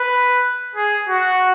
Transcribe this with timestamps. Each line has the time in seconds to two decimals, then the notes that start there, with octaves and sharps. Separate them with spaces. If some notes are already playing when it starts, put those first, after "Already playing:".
Already playing: B4
0.75 G#4
1.09 F#4